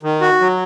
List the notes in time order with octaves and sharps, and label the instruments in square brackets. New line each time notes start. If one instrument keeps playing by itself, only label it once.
[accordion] D#3
F#4
F#3